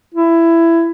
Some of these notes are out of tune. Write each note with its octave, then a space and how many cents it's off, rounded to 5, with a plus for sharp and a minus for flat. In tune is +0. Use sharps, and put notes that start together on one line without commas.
E4 +15